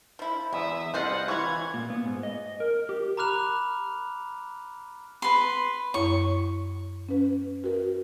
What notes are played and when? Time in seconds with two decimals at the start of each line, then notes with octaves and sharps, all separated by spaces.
0.19 F3 E4
0.53 E2 G#3 E5 D#6
0.94 C2 F4 B4 C5 D#5 F#5
1.28 E3 F4 C#5 G#6
1.74 A#2
1.90 B3
2.04 G#2
2.23 D#5
2.60 A#4
2.89 G4
3.17 A#5 B5 D6 F6 F#6 F7
5.22 B4 C6
5.94 F#2 E4 C#5 C#6
7.09 C#4 B4
7.64 F#4 A#4